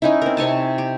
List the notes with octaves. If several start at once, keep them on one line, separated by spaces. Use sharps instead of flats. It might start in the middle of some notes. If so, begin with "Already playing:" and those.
C#4 D#4 E4
C4 A#4
C3 C#5 G#5 A5
G4